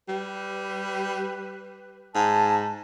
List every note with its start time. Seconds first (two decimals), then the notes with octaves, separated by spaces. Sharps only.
0.08 G3 B4
2.15 G#2 A5